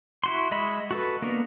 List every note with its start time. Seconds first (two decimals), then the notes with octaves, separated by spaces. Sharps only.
0.24 E4 F#4 C6
0.51 G#3 D#5 E5 B5
0.91 F#4 A4 B4
1.22 A#3 B3 D4 A#4